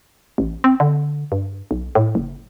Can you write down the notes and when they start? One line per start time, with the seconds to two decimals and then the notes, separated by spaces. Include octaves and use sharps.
0.38 A1
0.64 C4
0.80 D3
1.32 G2
1.71 B1
1.95 A2
2.15 F#1